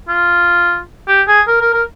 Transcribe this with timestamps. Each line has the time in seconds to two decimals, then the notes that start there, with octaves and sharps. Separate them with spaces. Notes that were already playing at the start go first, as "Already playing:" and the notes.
0.09 F4
1.08 G4
1.28 G#4
1.48 A#4
1.61 A#4
1.74 A#4